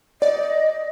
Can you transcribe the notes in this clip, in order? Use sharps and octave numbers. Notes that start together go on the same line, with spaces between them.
D5 D#5